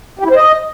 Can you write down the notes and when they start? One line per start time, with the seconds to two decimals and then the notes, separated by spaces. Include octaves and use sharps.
0.19 G4
0.25 E4
0.31 C5
0.36 D#5